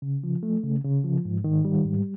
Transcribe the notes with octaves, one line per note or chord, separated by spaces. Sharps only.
C#3
F3
A3
C#3
C#3
F3
G#2
D#3
G3
G#2